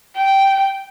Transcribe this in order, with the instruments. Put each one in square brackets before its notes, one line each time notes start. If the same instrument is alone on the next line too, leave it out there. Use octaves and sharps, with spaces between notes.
[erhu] G5